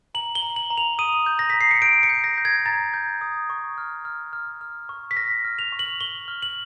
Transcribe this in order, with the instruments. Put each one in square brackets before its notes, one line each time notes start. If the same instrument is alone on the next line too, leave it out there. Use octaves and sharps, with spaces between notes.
[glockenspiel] A#5 F#7
G7
A#5
F#7
A#5
F7
D#6 D#7
G6
A#6
A#5 B6
C7
C#7
G6 D7
C#7
G6
A#6
G6
G#6
A#5 A6
G6
D#6
C#6
F6
F6
F6
F6
C#6
B6
F6 A#6
F6
F7
C#6
F#7
C#6 G7
F6
F#7